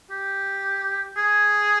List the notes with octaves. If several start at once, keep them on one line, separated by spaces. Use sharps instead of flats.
G4
G#4